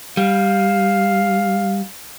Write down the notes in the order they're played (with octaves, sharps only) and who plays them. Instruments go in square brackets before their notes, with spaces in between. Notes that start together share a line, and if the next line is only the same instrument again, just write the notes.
[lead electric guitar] G3 [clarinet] F5